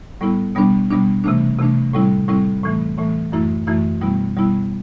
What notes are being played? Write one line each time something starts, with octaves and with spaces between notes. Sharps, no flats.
A2 G3 B3 E4
B2 G3 B3 D4
B2 G3 B3 D4
C3 E3 A3 D4
C3 E3 A3 D4
A2 G3 C4 E4
A2 G3 C4 E4
A2 E3 A3
A2 E3 A3
F#2 E3 A3 E4
F#2 E3 A3 E4
B2 G3 B3 E4
B2 G3 B3 E4